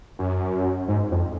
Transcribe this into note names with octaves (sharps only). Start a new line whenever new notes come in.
F#2
G#2
F2